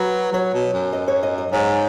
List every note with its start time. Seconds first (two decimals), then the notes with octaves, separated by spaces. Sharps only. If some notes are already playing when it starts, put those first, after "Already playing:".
Already playing: F#3 B4
0.33 F#3 C#5
0.54 B2
0.74 F#2
0.93 D#5
1.08 C#5
1.23 D#5
1.38 D#5
1.52 G#2 C#5